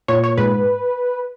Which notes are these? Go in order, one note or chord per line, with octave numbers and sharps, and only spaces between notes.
A#2 C#5
C#5
G#2 B4